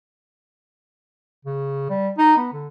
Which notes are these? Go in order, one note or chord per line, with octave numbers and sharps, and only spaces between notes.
C#3
G3
D#4
B3
D3